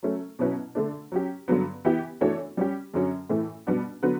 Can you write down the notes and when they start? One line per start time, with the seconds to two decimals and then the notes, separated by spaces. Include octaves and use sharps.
0.03 F#3 A3 C#4
0.39 B2 F#3 C#4 E4 B4
0.75 D3 A3 D4
1.12 F#3 C#4 G4
1.48 G2 D3 F#3 B3
1.85 E3 B3 E4 G4
2.21 E3 A3 D4 F#4 C#5
2.57 G3 C#4 G4
2.94 F#2 D3 F#3 C#4
3.29 A2 E3 A3
3.67 B2 G3 B3 D4 F#4
4.03 D3 F#3 B3 F#4 B4